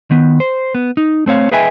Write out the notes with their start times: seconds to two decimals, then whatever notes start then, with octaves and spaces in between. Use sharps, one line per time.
0.11 D#3 B3
0.40 C5
0.75 B3
0.97 D#4
1.26 A3 C4 C#5 F5
1.52 G#4 B4 D#5 E5 G5 G#5